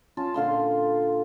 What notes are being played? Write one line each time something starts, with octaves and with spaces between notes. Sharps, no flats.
C#4 F4 A5
A#2 D3 F5 C6